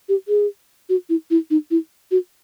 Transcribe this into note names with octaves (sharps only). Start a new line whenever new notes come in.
G4
G#4
F#4
E4
E4
D#4
E4
F#4